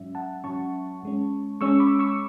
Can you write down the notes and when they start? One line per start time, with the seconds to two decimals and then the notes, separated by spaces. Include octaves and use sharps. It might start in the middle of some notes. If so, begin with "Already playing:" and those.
Already playing: G#2 F#3 C#4 E5
0.15 F#5 A5
0.44 G#2 F#3 C#4 A5 C#6
1.03 G#2 G#3 C#4
1.61 G#2 G#3 C#4 C#6 E6
1.80 B5 D6
1.99 C#6 E6